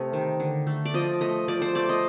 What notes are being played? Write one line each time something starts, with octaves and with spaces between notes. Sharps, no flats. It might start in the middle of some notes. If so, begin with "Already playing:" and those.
Already playing: C3 A3 D#5
D#3
D3
A3
D5
F3 D#5
A3 D#5
F3 D5
C5
A3 D5
D#5